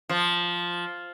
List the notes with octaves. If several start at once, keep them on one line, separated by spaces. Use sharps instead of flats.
F3